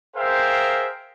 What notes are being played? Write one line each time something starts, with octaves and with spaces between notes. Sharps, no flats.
G#4 A#4 C5 E5 F5 G5